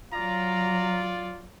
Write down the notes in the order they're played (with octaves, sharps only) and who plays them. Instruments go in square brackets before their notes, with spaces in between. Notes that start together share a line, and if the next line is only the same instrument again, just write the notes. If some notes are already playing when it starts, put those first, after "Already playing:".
[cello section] F#3 [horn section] F4 D5 [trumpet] A#5